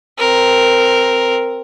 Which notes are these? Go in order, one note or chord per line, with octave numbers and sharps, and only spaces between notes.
C4 A#4